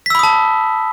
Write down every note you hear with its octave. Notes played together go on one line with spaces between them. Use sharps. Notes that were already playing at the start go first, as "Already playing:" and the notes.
A5 B5 D#6 E6 B6